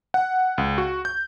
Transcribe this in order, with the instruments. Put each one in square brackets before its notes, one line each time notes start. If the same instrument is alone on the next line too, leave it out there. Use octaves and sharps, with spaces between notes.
[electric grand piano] F#5
C#2
F#4
G6